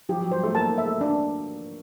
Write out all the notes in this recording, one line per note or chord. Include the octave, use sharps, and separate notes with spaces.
F3 G4
F#3
G3 C5
A3
A#3 A5
A#3
E5
A3
D4